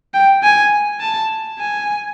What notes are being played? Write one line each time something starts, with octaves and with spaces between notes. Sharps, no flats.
G5
G#5
A5
G#5